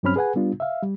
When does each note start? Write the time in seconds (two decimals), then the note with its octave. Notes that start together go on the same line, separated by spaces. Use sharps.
0.03 G2 F#3 C4 C#4 B5 F6
0.16 G#4 B4 F#5 G#5
0.36 G3 B3 D4 F4
0.60 E5 F5
0.82 G3